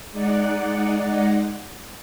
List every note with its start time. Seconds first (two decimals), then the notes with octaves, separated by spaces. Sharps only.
0.12 G#3 D#4 D5 F#5